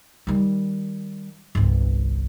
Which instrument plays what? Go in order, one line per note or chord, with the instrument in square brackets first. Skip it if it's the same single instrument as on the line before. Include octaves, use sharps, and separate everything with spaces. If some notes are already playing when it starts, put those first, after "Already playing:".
[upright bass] D#3 G3
G1 C2